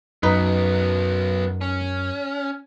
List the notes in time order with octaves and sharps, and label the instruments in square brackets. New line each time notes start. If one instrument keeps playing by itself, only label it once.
[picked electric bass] F#2 [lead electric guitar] F#3 B3 [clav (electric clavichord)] D#4 B4
[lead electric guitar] C#4